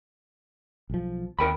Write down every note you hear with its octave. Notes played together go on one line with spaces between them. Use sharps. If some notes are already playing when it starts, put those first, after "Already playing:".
B1 F3
D#2 A#4 G5 B5